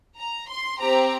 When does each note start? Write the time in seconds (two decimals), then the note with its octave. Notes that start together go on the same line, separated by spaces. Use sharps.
0.18 A#5
0.49 C6
0.80 C4 G4 A#5